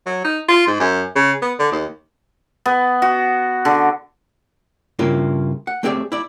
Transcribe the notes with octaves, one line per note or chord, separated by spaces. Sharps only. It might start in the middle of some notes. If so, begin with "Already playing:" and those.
F#3
D#4
F4
G#2
F#2
C#3
B3
D3
D#2
B3
F#4
D3
G2 C#3 A#3 E4 F4
F#5
A3 C4 G4 G#4 D5 E5
E4 D5